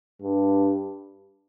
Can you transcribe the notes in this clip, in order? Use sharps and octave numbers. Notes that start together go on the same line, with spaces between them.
G2